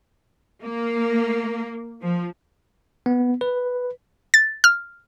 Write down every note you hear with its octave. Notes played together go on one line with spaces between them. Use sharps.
A#3
F3
B3
B4
A6
F6